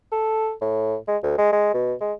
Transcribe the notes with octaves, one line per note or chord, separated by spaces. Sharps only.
A4
A2
G#3
D2
G#3
G#3
B2
G#3